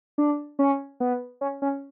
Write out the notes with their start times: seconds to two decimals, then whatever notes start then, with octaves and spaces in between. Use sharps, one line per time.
0.18 D4
0.59 C#4
1.00 B3
1.41 C#4
1.62 C#4